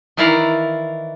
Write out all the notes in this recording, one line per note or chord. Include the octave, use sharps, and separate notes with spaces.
D#3 E3 E4 D5 F5 A#5